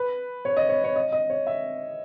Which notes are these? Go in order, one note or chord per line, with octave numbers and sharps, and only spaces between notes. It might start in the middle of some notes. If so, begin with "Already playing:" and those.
Already playing: B4
C#5
D#5
C#5
C#5
D#5
D#5
C#5
E5